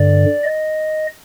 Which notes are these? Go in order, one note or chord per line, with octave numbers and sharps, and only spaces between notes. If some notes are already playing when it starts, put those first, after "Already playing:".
Already playing: G2 D3 D5
D#5